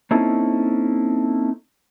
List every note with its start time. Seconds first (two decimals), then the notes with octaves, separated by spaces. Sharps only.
0.11 A#3 C4 C#4 D#4 E4 A4